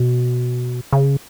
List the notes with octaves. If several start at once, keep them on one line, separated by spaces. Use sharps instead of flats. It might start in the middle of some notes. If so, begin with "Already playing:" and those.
Already playing: B2
C#3